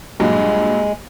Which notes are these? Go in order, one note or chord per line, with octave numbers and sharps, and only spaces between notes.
G2 A#2 F#3 G#3